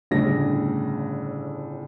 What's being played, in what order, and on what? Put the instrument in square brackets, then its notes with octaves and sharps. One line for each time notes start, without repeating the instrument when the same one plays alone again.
[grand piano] G1 A2 C#3 A3 D4 A#6